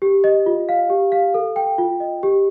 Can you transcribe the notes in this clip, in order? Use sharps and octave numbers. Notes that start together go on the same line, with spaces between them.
G4
D#5
F4
F5
G4
F5
A4
G5
F4
D#5
G4